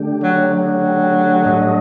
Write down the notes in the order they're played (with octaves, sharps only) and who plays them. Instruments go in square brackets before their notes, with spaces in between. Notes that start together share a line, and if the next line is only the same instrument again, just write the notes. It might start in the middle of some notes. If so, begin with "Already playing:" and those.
Already playing: [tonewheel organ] D3 A3 D4 G4
[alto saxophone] F#3
F#3
[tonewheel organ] A2 G3 D4 A4 D#5